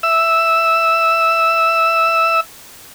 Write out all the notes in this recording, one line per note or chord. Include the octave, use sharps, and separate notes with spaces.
E5 E6